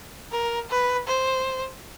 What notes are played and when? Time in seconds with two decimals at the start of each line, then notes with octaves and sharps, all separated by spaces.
0.32 A#4
0.70 B4
1.07 C5